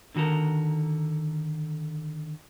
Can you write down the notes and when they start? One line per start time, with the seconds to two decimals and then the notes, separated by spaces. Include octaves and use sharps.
0.15 D3 D#3 F#4 A4 A#4